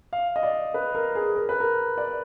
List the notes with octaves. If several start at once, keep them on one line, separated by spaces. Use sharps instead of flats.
F5
D#5
D5
B4
A#4
G#4
A#4
B4
A#4
D5